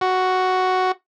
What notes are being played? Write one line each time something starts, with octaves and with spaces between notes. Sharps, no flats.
F#4